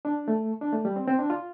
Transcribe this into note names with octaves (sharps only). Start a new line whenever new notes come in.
D4
A3
D4
A3
G3
C4
C4
D4
F4